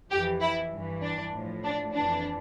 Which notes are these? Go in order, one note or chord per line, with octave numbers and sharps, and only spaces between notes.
F2 E3 G4
E4
G2 E3
D4
A2 F3
D4
F2 E3 D4